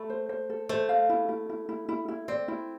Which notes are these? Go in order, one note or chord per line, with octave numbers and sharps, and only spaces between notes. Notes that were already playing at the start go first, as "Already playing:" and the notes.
Already playing: A3 B5
C5
C5
A4
A3 C5
F5
E4
E4
E4
E4
E4
E4
C4 D5
E4